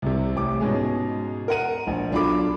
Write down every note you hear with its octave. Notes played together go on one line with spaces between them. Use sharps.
C2 C3
A1 G4 D6
G#2 B2 G#3 C#4 G#4
A#4 F#5 D#7
A#1
B1 D4 F4 A4 B5 D6